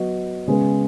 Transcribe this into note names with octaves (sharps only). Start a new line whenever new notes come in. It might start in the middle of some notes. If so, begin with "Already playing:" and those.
Already playing: F#3 B3 F#4 D#5
C#3 G#3 B3 G#4